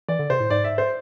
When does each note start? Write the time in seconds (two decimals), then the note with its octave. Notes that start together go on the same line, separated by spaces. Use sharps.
0.08 E3 D5
0.19 D3
0.30 C3 C5
0.40 A2
0.50 G#2 D5
0.64 E5
0.78 C5